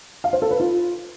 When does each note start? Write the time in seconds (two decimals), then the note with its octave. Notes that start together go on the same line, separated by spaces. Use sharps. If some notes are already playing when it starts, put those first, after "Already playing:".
0.24 F5
0.33 C5
0.42 A4
0.51 B4
0.60 F4